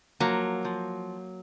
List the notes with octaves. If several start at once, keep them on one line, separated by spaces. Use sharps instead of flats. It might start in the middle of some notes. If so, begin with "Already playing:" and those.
F3 F#3 A#3
F3